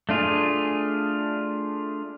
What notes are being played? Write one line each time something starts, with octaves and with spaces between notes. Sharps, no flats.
A3 D4 F4 G#4